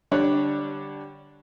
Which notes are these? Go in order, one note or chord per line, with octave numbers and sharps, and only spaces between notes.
D3 G3 D4 C#5 F#6